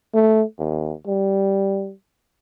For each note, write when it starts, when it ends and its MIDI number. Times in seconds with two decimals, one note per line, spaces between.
0.14 0.43 57
0.58 0.92 39
1.07 1.92 55